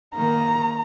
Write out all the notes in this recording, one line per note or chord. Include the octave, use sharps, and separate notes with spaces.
D#3 A#3 A#5